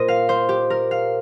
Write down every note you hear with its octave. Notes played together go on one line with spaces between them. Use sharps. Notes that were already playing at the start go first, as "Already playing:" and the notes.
Already playing: A#2 A#3 A#4 C5 D#5
F5
C5
G4
A#4
F5